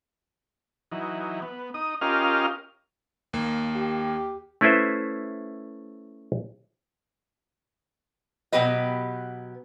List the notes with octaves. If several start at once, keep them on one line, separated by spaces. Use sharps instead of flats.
E3 F#3 D#4
B3
D#4 D#6
C#4 F4 G4 A#4 D#5 F5
D#2 A#3
G4
A3 C#4 E4 B4 C5 E5
B2 F#3 B3 G4 B4 D#5